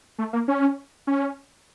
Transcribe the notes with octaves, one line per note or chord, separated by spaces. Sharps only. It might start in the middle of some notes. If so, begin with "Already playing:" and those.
A3
A#3
C#4
C#4